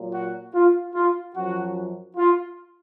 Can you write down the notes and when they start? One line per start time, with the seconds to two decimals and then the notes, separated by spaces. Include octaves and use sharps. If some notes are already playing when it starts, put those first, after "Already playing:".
Already playing: A#2 F#3
0.14 F#4
0.54 F4
0.95 F4
1.36 F#2 F3 F#4
2.17 F4